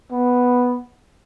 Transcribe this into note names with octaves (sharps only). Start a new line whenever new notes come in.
B3